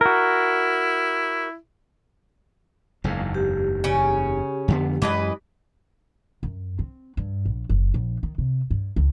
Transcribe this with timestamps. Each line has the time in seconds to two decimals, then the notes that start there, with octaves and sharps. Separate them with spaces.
0.01 E4 F#4 A#4
3.04 F#1 E2 G#2 F5
3.34 G4
3.84 C#3 C#4
4.68 F2 D3 B3
5.02 F#2 E3 G#3 B4 D#5
6.43 F#2
6.79 C4
7.17 G2
7.45 A#1
7.69 F#1
7.94 A#1
8.23 D#3
8.38 C3
8.70 G2
8.96 C#2